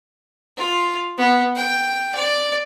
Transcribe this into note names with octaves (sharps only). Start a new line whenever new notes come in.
F4
B3
G5
D5